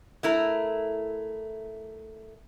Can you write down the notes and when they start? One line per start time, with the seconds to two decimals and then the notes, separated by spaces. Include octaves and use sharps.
0.23 A3 E4 A#4